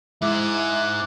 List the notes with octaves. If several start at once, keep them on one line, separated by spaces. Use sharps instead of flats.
G#2 E4 D6 F#6